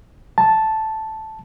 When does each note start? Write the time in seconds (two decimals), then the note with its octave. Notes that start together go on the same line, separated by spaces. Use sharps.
0.38 A5